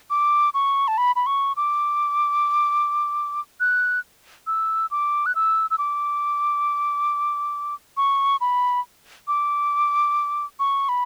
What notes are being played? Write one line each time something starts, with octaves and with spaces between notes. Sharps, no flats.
D6
C#6
A5
B5
B5
C#6
D6
F#6
E6
D6
F#6
E6
E6
D6
C#6
B5
D6
C#6
B5